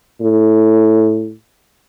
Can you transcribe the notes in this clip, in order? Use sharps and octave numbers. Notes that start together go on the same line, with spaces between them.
A2